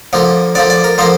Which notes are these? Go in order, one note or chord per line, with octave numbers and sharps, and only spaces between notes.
D3 F3 A#3
D3 F3 A#3 D5
D5
A#4
D3 F3 A#3 C5